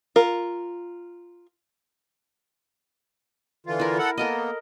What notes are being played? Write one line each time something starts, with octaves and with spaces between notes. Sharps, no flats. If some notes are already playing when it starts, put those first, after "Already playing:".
F4 A#4
D3 E3 F4
E4 A#4
A4 F#5
A#3 B3 A4 A#4 D#5